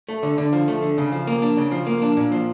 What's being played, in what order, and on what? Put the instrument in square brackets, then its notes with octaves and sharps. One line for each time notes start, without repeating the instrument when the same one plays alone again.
[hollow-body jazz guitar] A3
D3
D3
F3
A3
D3
C#3
F3
A#3
D4
C#3
F3
A#3
D4
A#2
F3